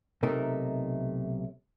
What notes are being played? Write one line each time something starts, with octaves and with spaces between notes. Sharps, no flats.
B1 C3 A3 D#4 A#4